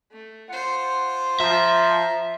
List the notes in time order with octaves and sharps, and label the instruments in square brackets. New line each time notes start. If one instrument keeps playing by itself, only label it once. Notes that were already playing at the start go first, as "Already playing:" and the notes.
[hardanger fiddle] A3
[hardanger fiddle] F4 C5 [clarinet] F#5
[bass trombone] F3 [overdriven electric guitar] E5 [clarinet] A#5